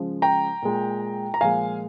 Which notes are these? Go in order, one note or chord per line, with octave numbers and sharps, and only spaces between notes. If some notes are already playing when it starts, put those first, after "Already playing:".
Already playing: C#3 F3 G#3
G5 A#5
A#2 G#3
A#5
A#2 F3 G#3 F5 G#5